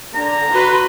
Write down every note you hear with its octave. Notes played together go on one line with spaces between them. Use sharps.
D3 A#5
F#4 B4 C6